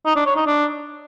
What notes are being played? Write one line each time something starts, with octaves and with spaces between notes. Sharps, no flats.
D#4
D4
C#5
D#4
D4